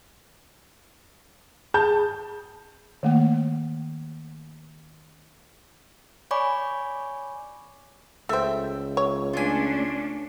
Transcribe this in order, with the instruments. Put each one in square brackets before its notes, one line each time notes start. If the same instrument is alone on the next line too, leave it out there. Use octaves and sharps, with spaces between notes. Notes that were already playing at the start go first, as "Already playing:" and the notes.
[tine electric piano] G#4 [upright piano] A5 G6
[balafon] D#3 A3 A#3
[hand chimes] C#5 D5 G#5 B5 C#6 D6
[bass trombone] C#2 [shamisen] A3 C5 [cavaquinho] E5 G5
[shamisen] C#5
[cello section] A3 C#4 D4 [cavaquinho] F4 G#5